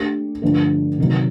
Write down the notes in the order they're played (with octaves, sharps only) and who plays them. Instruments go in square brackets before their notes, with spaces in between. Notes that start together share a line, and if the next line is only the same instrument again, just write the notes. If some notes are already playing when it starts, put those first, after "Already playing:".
Already playing: [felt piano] A3 D4 G4
G2 D3 F3 A3
C3 D#3 F#3